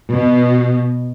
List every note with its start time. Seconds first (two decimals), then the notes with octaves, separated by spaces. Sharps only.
0.13 B2